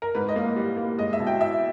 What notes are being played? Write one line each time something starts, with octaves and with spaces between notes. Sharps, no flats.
A#4
G#2 B4
D#5
A#3
G3
A#3
G#3 D#5
E5
B2
G5
E4 E5